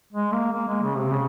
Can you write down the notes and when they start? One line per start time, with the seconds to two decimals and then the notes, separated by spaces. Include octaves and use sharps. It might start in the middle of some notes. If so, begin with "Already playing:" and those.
0.13 G#3
0.33 A#3
0.52 A#3
0.67 G#3
0.82 C#3
0.97 C3
1.12 C#3